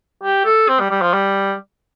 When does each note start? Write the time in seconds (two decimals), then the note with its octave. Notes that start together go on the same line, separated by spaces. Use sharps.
0.23 G4
0.45 A4
0.69 C4
0.79 G3
0.91 G3
1.02 F3
1.13 G3